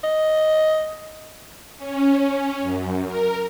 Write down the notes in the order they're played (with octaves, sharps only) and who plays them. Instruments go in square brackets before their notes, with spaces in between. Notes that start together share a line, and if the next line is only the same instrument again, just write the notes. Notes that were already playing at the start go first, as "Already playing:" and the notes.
[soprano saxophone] D#5
[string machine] C#4
F#2
A#4